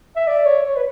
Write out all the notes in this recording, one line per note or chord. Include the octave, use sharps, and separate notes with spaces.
E5
D5
C#5
C#5
B4